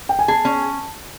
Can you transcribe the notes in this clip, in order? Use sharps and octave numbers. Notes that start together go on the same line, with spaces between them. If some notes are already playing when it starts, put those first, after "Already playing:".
G5
G#5
G#4 A5
C#4